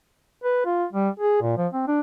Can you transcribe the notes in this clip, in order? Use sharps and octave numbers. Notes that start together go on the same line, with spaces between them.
B4
F4
G3
G#4
A#2
F3
C4
D4